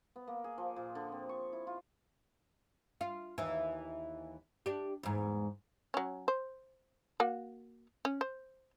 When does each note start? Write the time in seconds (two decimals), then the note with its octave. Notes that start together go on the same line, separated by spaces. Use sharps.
0.16 B3
0.27 A#3
0.44 G#4
0.58 F3
0.76 A#2
0.95 D3
1.12 C4
1.29 C#6
1.53 E4
1.67 F4
3.01 F4
3.38 D#2 E3
4.66 D4 G4
5.03 E2 G#2
5.94 F#3 C#4
6.28 C5
7.20 A#3 F#4
8.05 C#4
8.21 C5